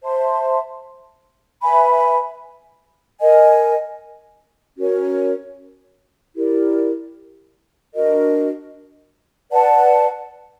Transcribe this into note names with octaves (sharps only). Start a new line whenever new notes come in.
C5 E5 A5 C6
B4 E5 G#5 B5
A#4 D#5 G#5
C#4 F#4 A#4 C#5
E4 G4 A#4 D5
D4 F#4 A#4 D#5
B4 D5 F#5 A5